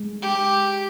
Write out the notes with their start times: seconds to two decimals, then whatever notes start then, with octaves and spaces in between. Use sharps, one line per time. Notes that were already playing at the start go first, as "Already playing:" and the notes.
Already playing: G#3
0.22 G4